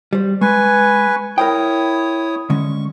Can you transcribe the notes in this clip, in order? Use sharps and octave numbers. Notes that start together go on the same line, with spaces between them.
G3 C5
G#3 B4 G#5 C#6
E4 A#4 C5 C#5 G5 D#6
D3 G#3 C#4 C#6